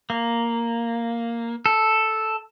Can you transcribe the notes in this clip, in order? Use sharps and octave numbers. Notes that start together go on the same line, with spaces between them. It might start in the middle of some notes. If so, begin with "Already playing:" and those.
A#3
A4